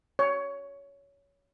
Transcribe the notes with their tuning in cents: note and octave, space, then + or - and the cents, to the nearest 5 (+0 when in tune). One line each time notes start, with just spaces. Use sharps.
C#5 +15